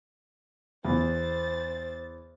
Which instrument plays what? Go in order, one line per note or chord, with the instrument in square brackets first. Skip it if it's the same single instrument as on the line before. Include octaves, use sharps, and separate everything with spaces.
[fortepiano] E2 [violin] C5 A6